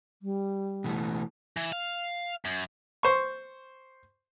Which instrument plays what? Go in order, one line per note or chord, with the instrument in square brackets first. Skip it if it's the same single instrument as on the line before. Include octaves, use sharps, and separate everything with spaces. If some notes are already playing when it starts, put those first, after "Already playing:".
[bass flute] G3
[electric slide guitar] B2 E3 A3
[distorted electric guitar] E3
F5
F#2
[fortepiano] C5 C#6